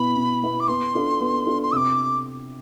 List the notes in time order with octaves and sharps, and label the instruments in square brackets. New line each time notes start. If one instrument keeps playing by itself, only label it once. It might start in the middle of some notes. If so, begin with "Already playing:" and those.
Already playing: [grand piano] B2 B3 E4 [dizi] B5
[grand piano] B2
B3 E4
[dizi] D6
[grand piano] B3 [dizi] C6
[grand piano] D4 F4 A4
B3
D4 F4 A4
[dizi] C6
[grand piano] C3 [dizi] D6 E6